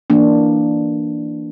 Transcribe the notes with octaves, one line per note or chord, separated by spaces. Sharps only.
E3 A#3 D4